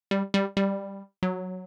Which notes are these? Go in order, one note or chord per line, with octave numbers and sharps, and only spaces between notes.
G3
G3
G3
F#3